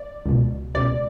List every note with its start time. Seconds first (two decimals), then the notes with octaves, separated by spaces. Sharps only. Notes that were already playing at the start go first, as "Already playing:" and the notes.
Already playing: D5
0.26 C#2 B2
0.75 C#2 B2 D5